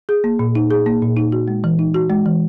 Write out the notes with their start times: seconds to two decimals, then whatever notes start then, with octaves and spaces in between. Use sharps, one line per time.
0.09 G#4
0.24 A#3
0.39 A#2
0.55 D#4
0.71 G#4
0.86 A#3
1.02 A#2
1.17 D#4
1.32 F#4
1.48 G#3
1.64 E3
1.79 D#4
1.94 F#4
2.10 G#3
2.26 E3